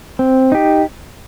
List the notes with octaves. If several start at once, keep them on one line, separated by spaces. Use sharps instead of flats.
C4
D#4 G4